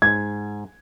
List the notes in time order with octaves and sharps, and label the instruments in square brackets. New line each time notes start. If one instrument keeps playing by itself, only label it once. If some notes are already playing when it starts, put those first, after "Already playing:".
[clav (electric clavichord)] G#2 [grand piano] G#6